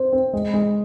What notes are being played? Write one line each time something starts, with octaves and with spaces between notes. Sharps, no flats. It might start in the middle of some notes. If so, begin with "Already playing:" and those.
Already playing: C4 C5
C4
G#3
G#3